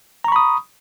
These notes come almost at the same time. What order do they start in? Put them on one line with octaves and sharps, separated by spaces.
A#5 C#6 B5 D#6